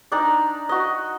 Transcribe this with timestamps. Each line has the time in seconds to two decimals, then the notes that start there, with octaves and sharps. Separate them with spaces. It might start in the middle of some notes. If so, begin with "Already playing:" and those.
0.12 D4 D#4 D5 A#5
0.69 F#4 D#5